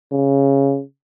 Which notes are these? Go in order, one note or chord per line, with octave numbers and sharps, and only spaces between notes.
C#3